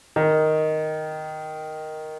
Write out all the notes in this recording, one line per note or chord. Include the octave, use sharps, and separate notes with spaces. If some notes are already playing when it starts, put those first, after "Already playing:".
D#3